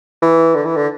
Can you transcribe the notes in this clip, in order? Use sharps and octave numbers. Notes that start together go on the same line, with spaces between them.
E3
D3
E3
D3